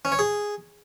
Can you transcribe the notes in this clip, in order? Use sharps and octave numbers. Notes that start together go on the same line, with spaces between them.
C#4
C#5
G#4